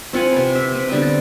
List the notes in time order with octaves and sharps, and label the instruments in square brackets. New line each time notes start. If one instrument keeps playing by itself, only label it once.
[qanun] C4 F4 F#5 G#5
C3 B4
E5
C4 B4
D3 G3 B3 C4
A5